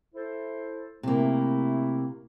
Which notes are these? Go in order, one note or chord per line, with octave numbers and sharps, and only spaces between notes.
E4 A4 C5
C3 A3 A#3 E4